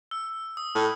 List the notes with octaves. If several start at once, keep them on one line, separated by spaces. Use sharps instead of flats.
E6
D#6
A2